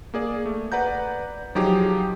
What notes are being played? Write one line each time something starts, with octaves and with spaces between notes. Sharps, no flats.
A#3 G#4 D5
A3
B4 D5 F#5 A#5 G6
F3 F#3 D#4 G4 G#4